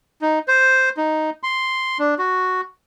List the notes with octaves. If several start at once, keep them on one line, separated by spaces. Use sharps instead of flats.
D#4
C5
D#4
C6
D4
F#4